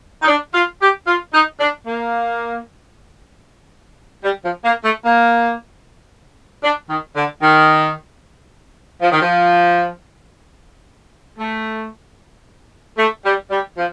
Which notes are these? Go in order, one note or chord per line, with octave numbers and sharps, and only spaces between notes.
D#4
D4
F4
G4
F4
D#4
D4
A#3
G3
F3
A#3
A3
A#3
D4
D#3
D3
D#3
F3
D#3
F3
A3
A3
G3
G3
F3